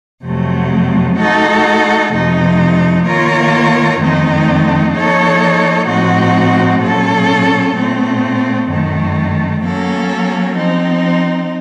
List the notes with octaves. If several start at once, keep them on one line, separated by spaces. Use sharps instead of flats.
F2 C3 F#3 A3
A3 D#4 F#4 A4
F2 C3 F3 A3 D#4
D#3 A#3 F4 A#4 C#5
F2 D#3 A3 C4 D#4
F3 A#3 D#4 A4 C#5
A2 F3 C4 D#4 F#4
A#2 F#3 A#3 C#4 A4
A#2 A3 C4
F#2 D#3 A3
F#3 A#3 C#4 A4
F3 C4 D#4